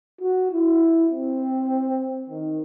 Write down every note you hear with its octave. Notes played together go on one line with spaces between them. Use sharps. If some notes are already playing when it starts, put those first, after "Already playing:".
F#4
E4
C4
D#3